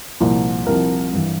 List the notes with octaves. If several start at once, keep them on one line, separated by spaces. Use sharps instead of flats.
C2 A#2 F3
C2 C3 F3 A#4
G2 E3